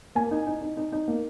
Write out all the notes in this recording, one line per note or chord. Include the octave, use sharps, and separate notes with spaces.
A#3 G#5
D#4
D#4
D#4
D#4
D#4
A#3